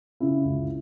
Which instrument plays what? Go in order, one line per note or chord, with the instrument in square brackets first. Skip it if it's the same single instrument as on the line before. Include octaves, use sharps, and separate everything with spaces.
[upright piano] C#3 E4
C#2